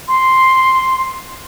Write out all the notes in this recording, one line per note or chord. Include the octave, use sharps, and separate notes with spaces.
C6